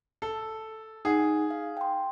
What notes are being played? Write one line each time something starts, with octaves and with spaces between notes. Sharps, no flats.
A4
D#4 G#4 F#5 G#5
F5
G5 C6